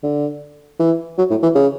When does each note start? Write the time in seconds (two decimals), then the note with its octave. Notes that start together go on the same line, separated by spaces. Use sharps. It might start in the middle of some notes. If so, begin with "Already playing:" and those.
0.03 D3
0.79 E3
1.18 F#3
1.30 A2
1.43 E3
1.55 C#3